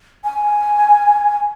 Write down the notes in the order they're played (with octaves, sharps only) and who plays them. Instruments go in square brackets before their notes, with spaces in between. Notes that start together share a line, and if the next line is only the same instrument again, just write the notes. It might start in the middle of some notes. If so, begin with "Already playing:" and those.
[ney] G#5